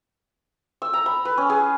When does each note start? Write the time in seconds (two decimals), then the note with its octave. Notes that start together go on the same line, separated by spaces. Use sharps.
0.82 E6
0.93 A#5
1.06 B5
1.25 B4
1.38 C#4
1.50 G#4